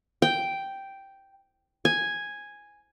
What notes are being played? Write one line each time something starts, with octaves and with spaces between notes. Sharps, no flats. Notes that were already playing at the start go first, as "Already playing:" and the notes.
G5
G#5